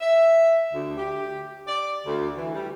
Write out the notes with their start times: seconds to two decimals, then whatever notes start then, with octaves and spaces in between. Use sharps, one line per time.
0.01 E5
0.74 D2
0.97 G4
1.67 D5
2.06 D2
2.36 E3
2.54 G3